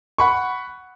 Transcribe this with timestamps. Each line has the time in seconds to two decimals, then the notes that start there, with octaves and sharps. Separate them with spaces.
0.18 F#5 B5 C#6